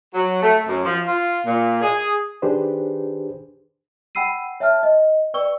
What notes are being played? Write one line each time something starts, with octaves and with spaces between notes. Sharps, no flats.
F#3
A3
F#2
F3
F4
A#2
G#4
D#3 D4 G4 G#4 B4 C5
F#5 G5 B5 E6 C7 D#7
C#5 E5 G5 A5 F6
D#5
B4 D5 G5 C#6 E6 G7